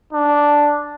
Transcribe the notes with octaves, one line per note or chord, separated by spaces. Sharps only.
D4